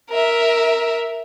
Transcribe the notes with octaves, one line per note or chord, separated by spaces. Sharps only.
A#4 E5